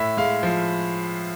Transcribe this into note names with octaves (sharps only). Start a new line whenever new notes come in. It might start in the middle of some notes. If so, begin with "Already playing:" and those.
Already playing: A2 E5
G#3 F5
F3